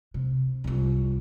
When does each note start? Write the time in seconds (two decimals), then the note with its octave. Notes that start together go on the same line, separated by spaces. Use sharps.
0.14 C3
0.64 C2 F4